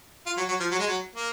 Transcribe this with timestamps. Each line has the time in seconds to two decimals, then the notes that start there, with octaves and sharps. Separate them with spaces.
0.26 F4
0.37 F#3
0.49 F#3
0.60 F3
0.71 F#3
0.79 G#3
0.87 F#3
1.16 A#3